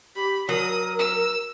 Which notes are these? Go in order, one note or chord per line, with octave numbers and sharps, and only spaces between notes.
G4 B5
F#3 A#4 D#6
E6